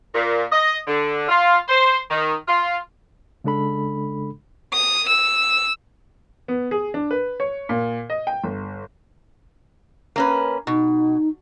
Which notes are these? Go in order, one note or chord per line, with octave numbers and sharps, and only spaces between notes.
A#2
D#5
D3
F4
C5
D#3
F4
C#3 G#3 D4 A4 B5
D#6
E6
B3
G#4
D4
B4
C#5
A#2
D#5
G5
G1
A#3 C#4 B4
B2 D#4